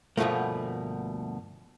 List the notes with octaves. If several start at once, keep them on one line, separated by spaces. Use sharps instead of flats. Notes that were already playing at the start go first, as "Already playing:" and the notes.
D2 G2 B2 F3 A3 A#3